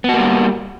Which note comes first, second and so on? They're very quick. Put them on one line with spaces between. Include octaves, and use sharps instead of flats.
B3 F#4 A#3 G3